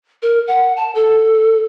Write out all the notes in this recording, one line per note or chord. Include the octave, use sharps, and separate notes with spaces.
A#4
F#5
A5
A4